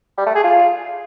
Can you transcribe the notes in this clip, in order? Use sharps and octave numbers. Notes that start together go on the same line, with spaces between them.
G3
A3
G#4
F4